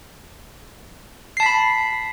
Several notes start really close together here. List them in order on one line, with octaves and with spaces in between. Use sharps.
C7 A5 B6 B5